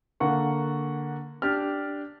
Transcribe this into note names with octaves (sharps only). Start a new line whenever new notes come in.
D3 A#3 F#5 C#6
D4 G4 D5 F6